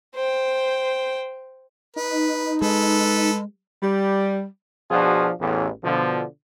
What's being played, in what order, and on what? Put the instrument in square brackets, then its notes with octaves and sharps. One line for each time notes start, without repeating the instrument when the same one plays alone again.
[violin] C5 G5
[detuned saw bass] D#4 [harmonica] B4
[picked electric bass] G#3 [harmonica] A4 B4
[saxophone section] G3
[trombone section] B2 F3 D4 F4 F#4 G#4
A1 E2
B2 D3 F3